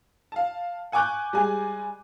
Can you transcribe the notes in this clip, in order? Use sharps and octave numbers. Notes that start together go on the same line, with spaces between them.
F5 A5
F#5 G#5 C#6 D6 F#6 G6
G3 G#3 G#5